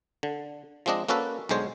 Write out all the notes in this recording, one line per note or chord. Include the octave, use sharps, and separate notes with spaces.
D3
F3 G#3 C4 D4 D#5
A#3 C#4 F#4 A4 B4
B1 D3 G#3 C5 C#5